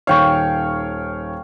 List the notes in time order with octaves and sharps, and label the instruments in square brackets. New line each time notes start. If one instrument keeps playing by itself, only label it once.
[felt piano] D#1 D#3 C#5 [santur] F5 G5 C#6